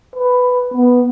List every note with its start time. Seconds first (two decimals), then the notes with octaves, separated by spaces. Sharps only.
0.16 B4
0.74 B3